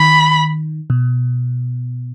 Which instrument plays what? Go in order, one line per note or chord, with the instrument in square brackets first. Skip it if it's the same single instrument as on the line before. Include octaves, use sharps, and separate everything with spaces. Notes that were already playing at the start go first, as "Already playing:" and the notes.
Already playing: [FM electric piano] D#3 [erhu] B5
[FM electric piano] B2